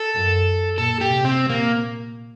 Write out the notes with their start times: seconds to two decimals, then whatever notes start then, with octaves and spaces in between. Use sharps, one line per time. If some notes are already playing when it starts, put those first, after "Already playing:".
Already playing: A4
0.15 F#2
0.78 A#2 A4
1.01 G4
1.10 C3
1.25 C4
1.41 A#2
1.50 A#3